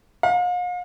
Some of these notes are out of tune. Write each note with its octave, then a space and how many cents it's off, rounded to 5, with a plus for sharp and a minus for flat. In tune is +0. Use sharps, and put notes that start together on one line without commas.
F5 +40